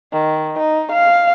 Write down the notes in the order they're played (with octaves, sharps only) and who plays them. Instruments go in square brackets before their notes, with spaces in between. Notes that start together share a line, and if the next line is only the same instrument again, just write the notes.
[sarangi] D#3
D#4
F5